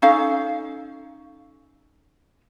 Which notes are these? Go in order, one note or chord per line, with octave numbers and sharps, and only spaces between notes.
C#4 D#4 A4 F5